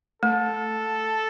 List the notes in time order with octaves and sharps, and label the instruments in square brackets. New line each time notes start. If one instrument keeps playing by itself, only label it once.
[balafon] A3 [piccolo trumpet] A4